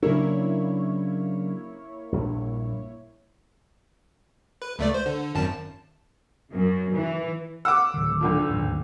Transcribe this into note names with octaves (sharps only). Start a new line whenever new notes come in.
C#3 F#3 A#3 D4 E4 C#5
A#1 G2
B4
C#2 A3 D5
C5
D3
G#1 F#2 A5
F#2
E3
F#5 D6 E6
D1 D#3
B1 D3 F3
D1 G#1 D#2